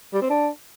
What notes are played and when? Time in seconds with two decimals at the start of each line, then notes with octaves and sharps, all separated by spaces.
0.13 G3
0.22 C4
0.30 D4